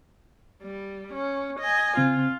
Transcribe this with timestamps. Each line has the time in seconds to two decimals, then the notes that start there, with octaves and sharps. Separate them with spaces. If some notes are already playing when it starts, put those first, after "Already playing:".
0.63 G3
1.14 C#4
1.60 D#5 G#5
1.97 C#3 C4 F4